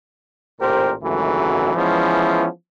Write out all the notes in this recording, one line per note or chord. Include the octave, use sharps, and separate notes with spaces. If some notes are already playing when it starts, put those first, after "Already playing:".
A1 A#2 G4 A#4 C5
G#1 C#2 F#2 E3 F#3 A3
E3 F3 G#3 B3 C#4 E4